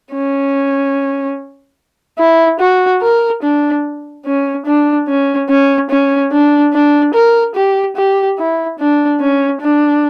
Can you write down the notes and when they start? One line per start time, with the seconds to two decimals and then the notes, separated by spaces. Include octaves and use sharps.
0.13 C#4
2.19 E4
2.60 F#4
3.02 A#4
3.42 D4
4.25 C#4
4.66 D4
5.08 C#4
5.49 C#4
5.90 C#4
6.32 D4
6.73 D4
7.14 A#4
7.55 G4
7.96 G4
8.38 E4
8.79 D4
9.20 C#4
9.61 D4